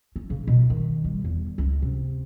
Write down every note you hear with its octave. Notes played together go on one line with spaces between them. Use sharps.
C#4
C#3
B2
D#3
G3
E2
C#2
C3